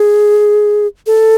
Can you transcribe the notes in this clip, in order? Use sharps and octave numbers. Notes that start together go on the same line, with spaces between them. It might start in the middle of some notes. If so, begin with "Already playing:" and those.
Already playing: G#4
A4